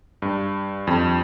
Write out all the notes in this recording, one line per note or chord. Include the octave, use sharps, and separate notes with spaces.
G2
F2